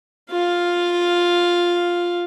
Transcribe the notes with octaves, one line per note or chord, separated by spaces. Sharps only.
F4 F5